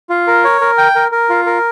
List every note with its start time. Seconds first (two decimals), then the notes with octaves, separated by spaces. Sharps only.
0.10 F4
0.27 A#4
0.44 C#5
0.61 A#4
0.78 G5
0.95 A#4
1.12 A#4
1.29 F4
1.46 A#4